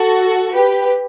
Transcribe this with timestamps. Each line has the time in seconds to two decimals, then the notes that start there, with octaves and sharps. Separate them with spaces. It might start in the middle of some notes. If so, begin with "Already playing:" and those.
Already playing: F#4 A4
0.54 G4 B4